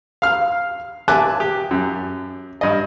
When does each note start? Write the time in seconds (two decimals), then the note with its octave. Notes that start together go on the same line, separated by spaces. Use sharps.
0.22 F5 F6
1.08 E5 G#5 A5 D6 F#6
1.40 G4
1.71 F#2
2.61 G2 D#5